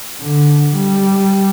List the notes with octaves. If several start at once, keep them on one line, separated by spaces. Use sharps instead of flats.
D3
G3